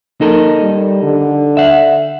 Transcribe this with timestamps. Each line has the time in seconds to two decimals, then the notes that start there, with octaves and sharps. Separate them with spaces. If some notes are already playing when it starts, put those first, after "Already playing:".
0.21 A#3 D#4 A4 A#4
0.60 G3
1.02 D3
1.57 E5 F#5